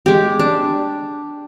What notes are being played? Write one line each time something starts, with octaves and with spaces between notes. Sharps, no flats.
G#3 G4
D4